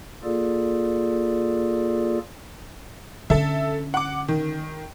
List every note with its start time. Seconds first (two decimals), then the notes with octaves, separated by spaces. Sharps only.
0.24 A#3 F4 G#4 A4 D5
3.30 D3 C#4 A4 E5
3.94 F#5 D6
4.28 D#3